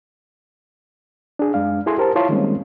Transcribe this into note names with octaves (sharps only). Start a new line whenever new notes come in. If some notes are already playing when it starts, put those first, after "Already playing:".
D4 G#4
F#2 G#3 D4 F5
E4 G#4 A4 G#5 C6
G4 A#4 C5 A5
E4 F4 C#5 F5 A5 C6
D#3 G3 G#3 A#3 C4 C#4